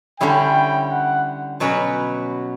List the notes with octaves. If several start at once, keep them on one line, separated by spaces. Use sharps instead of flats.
D3 G3 C#4 E4 G5
F#5
B2 F#3 C#4 F#4 B4